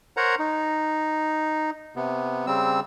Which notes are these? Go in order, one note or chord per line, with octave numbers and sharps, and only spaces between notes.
A#4 C5 C#5 F#5 A#5
D#4
C3 B3
C#3 G3 C4 E6